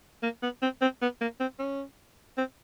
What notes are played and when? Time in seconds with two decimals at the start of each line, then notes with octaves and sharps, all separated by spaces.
0.23 A#3
0.43 B3
0.62 C4
0.81 C4
1.02 B3
1.21 A#3
1.40 C4
1.59 C#4
2.38 C4